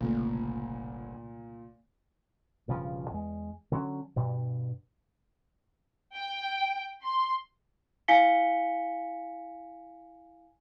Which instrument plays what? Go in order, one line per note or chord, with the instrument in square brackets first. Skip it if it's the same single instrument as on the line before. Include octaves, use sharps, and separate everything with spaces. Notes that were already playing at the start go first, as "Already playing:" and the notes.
[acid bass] G1 [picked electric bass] C2 C#3 A3 [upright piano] A#2
[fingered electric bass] E1 G2 C#3 F3
E2 G#3
D3 F#3 C#4
G2 B2
[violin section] G5
C6
[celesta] E4 F5 G#5 B6 C#7 G7